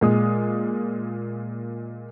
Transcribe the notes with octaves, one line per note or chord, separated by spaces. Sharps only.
A#2 G#3 D#6